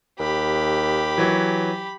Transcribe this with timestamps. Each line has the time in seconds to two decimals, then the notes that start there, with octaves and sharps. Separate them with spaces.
0.20 D#2 G4 B5
1.18 E3 F#3